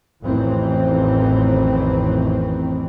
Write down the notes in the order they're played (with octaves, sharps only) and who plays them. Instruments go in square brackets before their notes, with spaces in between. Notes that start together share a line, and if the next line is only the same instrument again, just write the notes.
[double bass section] A1 F2 D#3 E3 C4